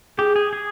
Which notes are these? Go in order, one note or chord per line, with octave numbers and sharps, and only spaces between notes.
G4 G#4
G#4
G#4